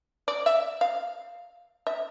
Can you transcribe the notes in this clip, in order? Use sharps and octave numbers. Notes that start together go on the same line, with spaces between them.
D5
E5
F5
E5